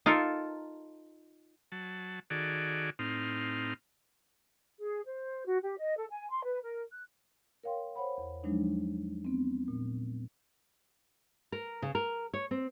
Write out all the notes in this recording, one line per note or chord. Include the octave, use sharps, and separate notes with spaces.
D#4 F4 A4 A#4
F#3 A5
D#3 F#4 G#4 A4 D5
A2 C4 D#4 F6
G#4
C5
F#4
G4
D#5
A4
G#5
C6
B4
A#4
F#6
A#4 C#5 F5 G5 C6
C5 C#5 F#5 B5
E2
F3 F#3 G#3 D4 D#4
B3 C4
A#2
A#4
C#3
A#4
C#5
C4